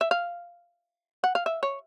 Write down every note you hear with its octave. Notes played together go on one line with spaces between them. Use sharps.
E5
F5
F#5
F5
E5
C#5